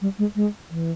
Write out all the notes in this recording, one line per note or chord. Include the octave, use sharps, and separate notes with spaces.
G3
G#3
G#3
E3